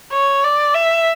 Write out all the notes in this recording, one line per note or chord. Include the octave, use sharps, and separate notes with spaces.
C#5
D5
E5